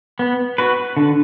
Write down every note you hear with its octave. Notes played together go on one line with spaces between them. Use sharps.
B3
F#4 B4
D3